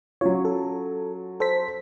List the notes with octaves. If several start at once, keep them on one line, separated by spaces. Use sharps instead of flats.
F#3 C#4 F4 C#5
A4
A4 C5 B6